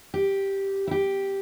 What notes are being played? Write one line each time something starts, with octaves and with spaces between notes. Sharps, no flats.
G4
E4
G4